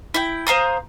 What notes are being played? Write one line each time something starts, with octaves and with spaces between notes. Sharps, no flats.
E4 G5
C5 F5 A#5 D#6